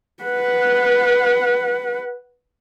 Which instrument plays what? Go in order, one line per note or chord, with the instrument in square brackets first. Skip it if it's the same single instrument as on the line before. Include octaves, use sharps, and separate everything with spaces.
[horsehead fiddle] B4 F#5